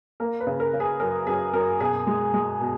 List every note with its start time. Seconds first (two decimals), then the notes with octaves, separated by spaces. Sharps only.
0.20 A#3 A#4
0.40 B4
0.47 C#3
0.60 A#4
0.74 C#3
0.80 G#4
1.00 F#2 A#4
1.27 F#2 G#4
1.53 F#2 A#4
1.80 B2 G#4
2.07 G#3
2.34 G#3
2.60 B2